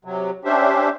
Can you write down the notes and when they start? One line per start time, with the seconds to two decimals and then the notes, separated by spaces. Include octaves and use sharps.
0.05 C3 F#3
0.45 C#4 D4 G4 C5 E5